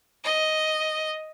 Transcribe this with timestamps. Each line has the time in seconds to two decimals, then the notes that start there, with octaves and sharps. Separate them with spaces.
0.24 D#5